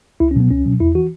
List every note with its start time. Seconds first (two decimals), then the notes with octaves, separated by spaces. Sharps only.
0.20 C#2 E4
0.31 C#4
0.36 B2 F#3 B3
0.51 C#2 C#4
0.65 B2 F#3
0.80 E2 E4
0.95 E3 F#4